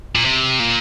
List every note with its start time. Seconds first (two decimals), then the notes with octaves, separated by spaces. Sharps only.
0.15 A#2
0.25 C3
0.60 A#2